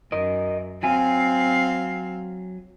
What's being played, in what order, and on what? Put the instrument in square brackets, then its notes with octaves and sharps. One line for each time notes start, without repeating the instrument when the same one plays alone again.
[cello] F#2 [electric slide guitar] A#4 D#5
[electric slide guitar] F#3 G#5 [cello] C4 F5